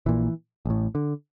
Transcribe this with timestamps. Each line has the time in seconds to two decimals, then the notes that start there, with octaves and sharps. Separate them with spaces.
0.06 A#1 A#2 E3
0.65 A1 A2
0.95 D3